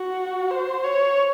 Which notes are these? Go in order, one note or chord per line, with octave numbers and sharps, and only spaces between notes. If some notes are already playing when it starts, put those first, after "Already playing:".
Already playing: F#4
C5
C#5